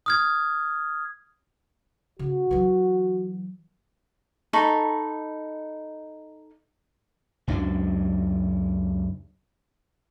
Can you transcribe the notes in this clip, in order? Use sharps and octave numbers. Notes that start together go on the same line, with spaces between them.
D#6 F6 G#6
C#3 F#4
E3 F#3
D#4 A4 B5 C#6
C#2 F#2 F#3 D4